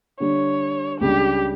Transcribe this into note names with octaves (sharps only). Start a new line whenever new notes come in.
D3 G3 D4 C#5
C#2 C#3 G3 D4 G4